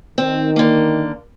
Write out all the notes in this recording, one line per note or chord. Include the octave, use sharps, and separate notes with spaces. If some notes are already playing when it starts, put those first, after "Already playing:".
D#3 C4
D3 A#3